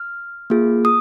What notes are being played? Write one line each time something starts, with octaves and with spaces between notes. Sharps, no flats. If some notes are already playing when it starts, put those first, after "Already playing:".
Already playing: F6
A#3 F4 G#4
D#6